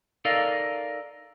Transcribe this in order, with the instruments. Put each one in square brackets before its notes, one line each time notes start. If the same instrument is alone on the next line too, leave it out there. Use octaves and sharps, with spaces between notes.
[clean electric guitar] D#4 A4 A#4 D5 D#5 F5